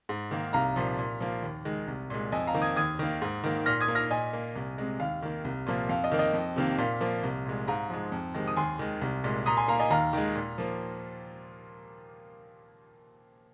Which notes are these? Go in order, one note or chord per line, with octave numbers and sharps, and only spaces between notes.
G#2
D#3 A#3
C2 F5 A#5
A#2 F3
A#2
F3 A#3
D#2
D#3 G#3
C2
A#2 G#3
F2 D#5 G#5
F5 A#5
D#3 A#3
D#6 G#6
D#2 D#6 G#6
D#3 A#3
G#2
D#3 A#3
A#2 F6 A#6
D#6 G#6
A#3
F6 A#6
A#2 D#5 G#5
A#3
C2
C3 G#3
D#2 F5
D#3 A#3
C2
A#2 F3 A#3
F2 F5
D#5
D#3 A#3
D#5
F2
C3 D#3 A#3
A#2 F5
F3 A#3
C2
A#2 G#3
G#2 F5 A#5
F3 G#3
F2
C3 D#3 G#3
D#6
D#2 G#5 C6
D#3 G#3
C2
A#2 G#3
A#2 A#5 D#6
G#5 C6
A#3 F5 A#5
D#5 G#5
D#2 F5 A#5
D#3 G#3
A#2
F3 A#3